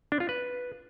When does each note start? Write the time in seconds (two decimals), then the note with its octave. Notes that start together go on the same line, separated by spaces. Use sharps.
0.12 D4
0.20 F4
0.29 B4